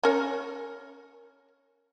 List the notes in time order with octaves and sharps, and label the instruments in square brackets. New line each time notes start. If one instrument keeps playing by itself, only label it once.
[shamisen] C#4 A#4 C#5